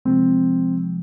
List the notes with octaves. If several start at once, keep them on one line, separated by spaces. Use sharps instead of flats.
C3 F3 G#3 C4